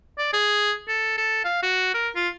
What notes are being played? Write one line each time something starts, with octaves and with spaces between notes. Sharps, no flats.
D5
G#4
A4
A4
F5
F#4
A#4
F4